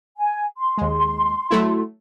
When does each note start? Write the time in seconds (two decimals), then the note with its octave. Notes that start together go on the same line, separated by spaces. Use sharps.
0.18 G#5
0.57 C6
0.78 D#2 G#3
1.51 F#3 A3 E4